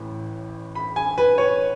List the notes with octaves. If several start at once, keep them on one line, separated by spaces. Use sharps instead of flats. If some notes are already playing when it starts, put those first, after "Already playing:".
Already playing: A1 A2 E3
B5
G#5
B4
C#5